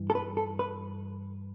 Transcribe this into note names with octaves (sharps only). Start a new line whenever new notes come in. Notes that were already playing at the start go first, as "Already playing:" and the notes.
Already playing: G2 E3
A4
B4
A4
B4